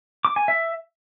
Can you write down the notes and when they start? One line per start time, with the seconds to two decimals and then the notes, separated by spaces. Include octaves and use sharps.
0.25 D6
0.36 G#5
0.48 E5